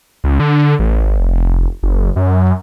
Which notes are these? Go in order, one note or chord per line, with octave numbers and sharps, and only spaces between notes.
C#2
D3
A1
G#1
F1
F#1
F#2